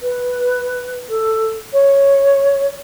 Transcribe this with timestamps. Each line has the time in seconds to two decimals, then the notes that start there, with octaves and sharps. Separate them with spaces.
0.01 B4
1.09 A4
1.73 C#5